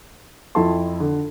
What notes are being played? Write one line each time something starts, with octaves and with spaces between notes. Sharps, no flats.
F2 E4 A4 A5 C6
D3